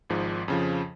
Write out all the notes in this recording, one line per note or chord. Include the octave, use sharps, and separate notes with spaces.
G#1 G#2 F3
F2 C#3 F3